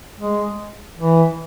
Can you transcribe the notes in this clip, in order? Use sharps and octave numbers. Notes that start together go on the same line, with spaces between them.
G#3
E3